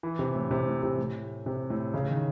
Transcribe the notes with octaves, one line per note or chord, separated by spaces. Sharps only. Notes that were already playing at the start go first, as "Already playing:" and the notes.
E3
C3
A2
C3
A2
C3
A2
C3
A2
C#3
D#3